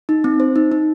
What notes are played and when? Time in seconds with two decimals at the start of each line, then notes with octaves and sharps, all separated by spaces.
0.09 D#4
0.24 C4
0.40 C5
0.56 D#4
0.72 D#4